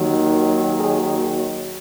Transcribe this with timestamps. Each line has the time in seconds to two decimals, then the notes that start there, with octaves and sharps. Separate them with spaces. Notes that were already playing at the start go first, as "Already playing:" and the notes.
Already playing: D#2 D#3 F#3
0.78 G#4